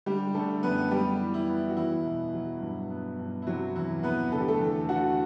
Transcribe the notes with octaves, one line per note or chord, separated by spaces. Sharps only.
D3 G3 G4
D3 A3 A4
F#2 B3 B4
G3 B3 G4
E3
E4
B3
F#4
E2 E4
B2
F#3
G2
B3
G2
E4
C3 F#3 F#4
E2 E4
E2 B3 B4
D3 A4
G4
A3 A4
E2
D3 F#4 F#5